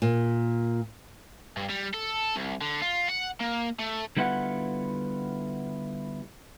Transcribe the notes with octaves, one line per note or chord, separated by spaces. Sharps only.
A#2
G2
G3
A4
C2
D3
F4
F#5
A#3
A3
D3 G3 B3 E4 F4 F#5